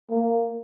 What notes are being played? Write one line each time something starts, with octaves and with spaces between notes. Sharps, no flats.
A#3